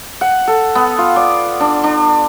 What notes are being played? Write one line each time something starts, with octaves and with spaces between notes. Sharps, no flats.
F#5
A4
B3
F4
D5
D4
D4